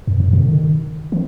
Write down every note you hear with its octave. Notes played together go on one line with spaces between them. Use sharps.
F2
F#2
B2
D3
D#3
E3